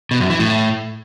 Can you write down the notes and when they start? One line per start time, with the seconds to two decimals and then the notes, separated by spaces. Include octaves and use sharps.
0.11 B2
0.21 F#2
0.30 E3
0.40 A2